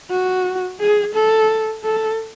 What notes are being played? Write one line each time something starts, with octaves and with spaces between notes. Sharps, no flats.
F#4
G#4
A4
A4